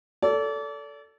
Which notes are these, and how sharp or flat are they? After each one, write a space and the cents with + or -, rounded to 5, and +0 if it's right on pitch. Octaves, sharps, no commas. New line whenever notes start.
A4 +5 D5 -35